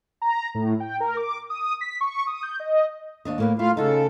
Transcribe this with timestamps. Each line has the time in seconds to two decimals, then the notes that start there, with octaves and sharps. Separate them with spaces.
0.22 A#5
0.55 A2
0.80 G5
1.00 A#4
1.17 D6
1.50 D#6
1.81 B6
2.01 C#6
2.27 D#6
2.43 G6
2.60 D#5
3.25 D#2 D4 D#5
3.38 A2 A#3 B4
3.59 A3 E4 F4 F5
3.77 C#3 D#4 F4 F#4 A4